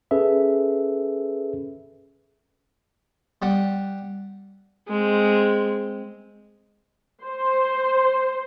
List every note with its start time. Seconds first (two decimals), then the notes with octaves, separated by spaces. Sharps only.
0.11 C#4 G#4 A4 B4 E5
3.42 G3 D5 F#5
4.88 G#3 C4
7.24 C5